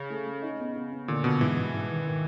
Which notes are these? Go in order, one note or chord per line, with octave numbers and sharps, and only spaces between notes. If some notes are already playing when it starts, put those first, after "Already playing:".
Already playing: C#3
A3
A3
D#4
B3
B3
B3
A#2 D3
B2 B3
G#2 E3
G#2
G#2
D#3
D#3